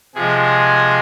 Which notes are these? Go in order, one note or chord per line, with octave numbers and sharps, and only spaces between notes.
C3 F3 G#3 G#4